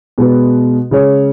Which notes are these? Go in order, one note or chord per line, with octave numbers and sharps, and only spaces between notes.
B2 G#3 B3 F#4 B4
C#3 G#3 C#4 G#4 C#5